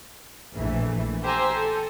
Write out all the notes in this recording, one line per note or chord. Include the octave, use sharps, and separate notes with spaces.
A#1 E3 A3
G4 C5 G#5 A#5 E6
A4